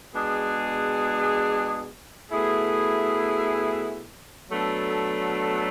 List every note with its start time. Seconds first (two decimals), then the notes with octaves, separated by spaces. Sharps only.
0.13 B2 G#3 D4 G#4
2.32 B2 A3 E4 G#4
4.50 B2 F#3 A3 D4 A4